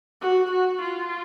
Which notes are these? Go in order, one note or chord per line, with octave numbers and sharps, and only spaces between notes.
F#4
F#4
F4